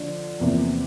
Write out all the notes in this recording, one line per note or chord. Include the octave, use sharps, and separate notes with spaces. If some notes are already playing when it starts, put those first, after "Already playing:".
Already playing: D3 F3 D4
E2 C3 F3 A#3